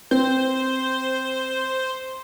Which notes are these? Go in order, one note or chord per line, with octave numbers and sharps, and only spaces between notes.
C4 C5